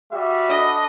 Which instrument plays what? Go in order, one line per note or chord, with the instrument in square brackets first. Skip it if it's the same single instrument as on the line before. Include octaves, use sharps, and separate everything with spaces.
[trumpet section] G3 F#4 E5
[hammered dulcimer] D4 A4 B5 [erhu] D#5